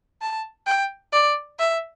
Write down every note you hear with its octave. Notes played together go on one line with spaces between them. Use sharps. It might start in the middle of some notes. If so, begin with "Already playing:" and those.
A5
G5
D5
E5